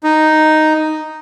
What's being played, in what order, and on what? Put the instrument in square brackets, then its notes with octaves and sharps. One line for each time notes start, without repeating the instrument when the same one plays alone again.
[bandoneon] D#4